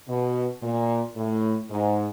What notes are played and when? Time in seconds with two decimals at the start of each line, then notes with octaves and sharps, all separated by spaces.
0.09 B2
0.62 A#2
1.17 A2
1.70 G#2